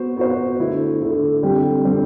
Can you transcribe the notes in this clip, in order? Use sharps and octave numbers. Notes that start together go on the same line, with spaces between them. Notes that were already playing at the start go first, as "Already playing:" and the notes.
Already playing: B3 F#4 C5
B3 F#4 C5
D3 A3 E4
D3 A3 E4
D3 G3 C4 G4
D3 G3 C4 G4